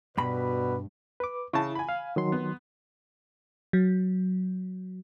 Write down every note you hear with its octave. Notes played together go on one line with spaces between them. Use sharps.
G2 B2 F#4 B4 D5 B5
B4 D6
C#3 E4 A5
G#5 B5
F5
D#3 F#3 C6
B3
F#3